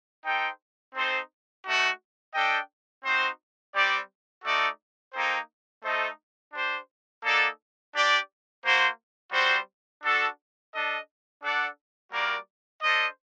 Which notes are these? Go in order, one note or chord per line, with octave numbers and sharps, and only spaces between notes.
D#4 A4 C5 G5
C4 D#4 A4 C5
A3 D#4 F#4
D4 A4 D#5 G5
C4 D#4 F#4 C5
G3 C4 G4 D5
A3 D#4 F#4 A4 D5
A#3 D#4 A4 C5 G5
A3 D#4 A4 C5 D#5
D4 G4 C5
A#3 D#4 A4 D5 F#5
D4 G4 D5
A#3 F#4 C5
G3 C4 F#4 C5
D4 F#4 A4
D4 A4 D#5
D4 A4 D5 F#5
G3 A#3 F#4 A#4 D5
D4 A4 C5 D#5